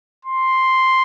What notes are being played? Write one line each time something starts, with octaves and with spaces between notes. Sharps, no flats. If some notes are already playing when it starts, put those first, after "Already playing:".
C6